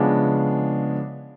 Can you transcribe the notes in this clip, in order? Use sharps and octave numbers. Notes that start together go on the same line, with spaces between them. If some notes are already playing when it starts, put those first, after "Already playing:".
Already playing: C#3 F3 G#3 B3 D4